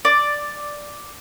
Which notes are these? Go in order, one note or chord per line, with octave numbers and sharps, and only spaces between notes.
D5